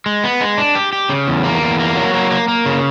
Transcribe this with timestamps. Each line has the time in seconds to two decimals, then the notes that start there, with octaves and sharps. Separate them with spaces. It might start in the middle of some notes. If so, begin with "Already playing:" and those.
0.06 G#3
0.24 B3
0.41 G#3
0.58 D4
0.75 G4
0.93 G4
1.10 C#3
1.28 E2
1.44 A#3
1.62 E2
1.80 A#3
1.96 F#3
2.14 A#3
2.31 A#3
2.48 A#3
2.66 C#3